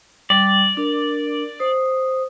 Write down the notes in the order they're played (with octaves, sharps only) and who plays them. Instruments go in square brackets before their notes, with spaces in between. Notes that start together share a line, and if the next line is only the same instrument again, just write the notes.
[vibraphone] G3 [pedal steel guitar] D5
[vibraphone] D4 A#4
C5 D#6